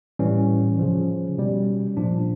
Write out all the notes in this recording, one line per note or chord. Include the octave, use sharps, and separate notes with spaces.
A2 E3 G3 C#4
C#3 F3
B2 G3
A#2 F3 D4